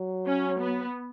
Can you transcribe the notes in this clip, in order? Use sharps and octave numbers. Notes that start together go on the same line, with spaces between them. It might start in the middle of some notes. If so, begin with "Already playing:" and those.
Already playing: F#3
C#4
B3